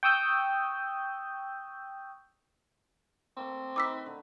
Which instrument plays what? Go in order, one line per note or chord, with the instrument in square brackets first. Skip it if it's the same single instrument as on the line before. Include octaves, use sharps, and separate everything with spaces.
[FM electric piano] G5 C#6 D#6 E6 G6
[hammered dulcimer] A3 A#3 [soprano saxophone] C4
[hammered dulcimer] D#3 D#4 B4 [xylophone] D6 E6 B6
[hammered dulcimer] D3